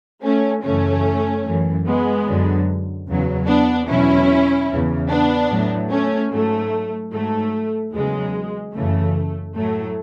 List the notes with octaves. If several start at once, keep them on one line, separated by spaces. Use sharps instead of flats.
A3 C#4
F#2 C#3 E3 A3 C#4
F#2 E3
G#3 B3
F#2 D3 F#3
E2 C#3 F#3
B3 D4
E2 B2 F#3 C#4 E4
E2 C#3 E3
B3 D4
A2 F#3
A3 C#4
G#2 F#3 A3
G#2 F#3 A3
E2 C#3 F#3 G#3
F#2 C#3 E3 A3
A2 F#3 A3